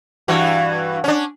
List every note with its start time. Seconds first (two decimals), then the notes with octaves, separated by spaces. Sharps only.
0.28 G2 E3 F#4
1.04 C#4 D4